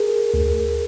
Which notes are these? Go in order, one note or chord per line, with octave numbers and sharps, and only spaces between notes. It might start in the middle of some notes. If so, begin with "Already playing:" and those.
Already playing: G#4 A#4
D2